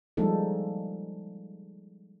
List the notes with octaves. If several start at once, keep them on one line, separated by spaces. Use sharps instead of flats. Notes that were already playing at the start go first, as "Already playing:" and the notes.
F3 G3 G#3 A#3 D#4 A4